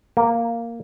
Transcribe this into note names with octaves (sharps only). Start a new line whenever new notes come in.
A#3